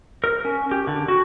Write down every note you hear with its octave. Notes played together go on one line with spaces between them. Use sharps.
A#4
C#4
G4
D3
F#4